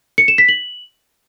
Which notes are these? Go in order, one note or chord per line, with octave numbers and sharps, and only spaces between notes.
C#7
E7
B6
F#7